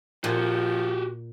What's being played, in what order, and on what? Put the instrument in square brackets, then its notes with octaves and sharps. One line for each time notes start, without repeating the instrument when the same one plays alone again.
[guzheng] A#2 [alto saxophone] F3 [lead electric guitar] F#4 G4